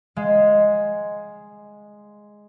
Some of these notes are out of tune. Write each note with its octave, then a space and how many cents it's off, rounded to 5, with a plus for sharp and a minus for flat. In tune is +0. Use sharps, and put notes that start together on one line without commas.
G#3 +0 F5 +5